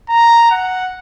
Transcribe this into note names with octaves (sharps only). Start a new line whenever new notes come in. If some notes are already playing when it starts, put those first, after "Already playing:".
A#5
F#5